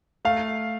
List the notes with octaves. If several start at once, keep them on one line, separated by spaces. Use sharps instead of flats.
A3 F5